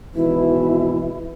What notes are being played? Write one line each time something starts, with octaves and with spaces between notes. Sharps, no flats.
G#1 B2 E3 E4